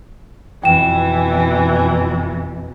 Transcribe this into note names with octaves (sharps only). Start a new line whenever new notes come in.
F2 B2 E3 G5 E7